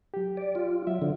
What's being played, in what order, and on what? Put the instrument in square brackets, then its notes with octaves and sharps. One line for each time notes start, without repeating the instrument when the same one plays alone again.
[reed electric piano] F#3 G4
[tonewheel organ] D5
F4
[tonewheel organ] F#3 [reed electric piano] E5
[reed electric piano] D3 [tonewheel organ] F3